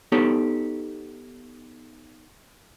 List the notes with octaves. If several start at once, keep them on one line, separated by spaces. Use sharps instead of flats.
B3 D#4 G4 A4 C#5